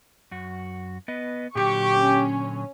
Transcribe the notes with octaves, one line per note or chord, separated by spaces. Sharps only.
F#2 F#4
B3 B4 D#5
A#2 D3 F#3 G4 C#6
C#4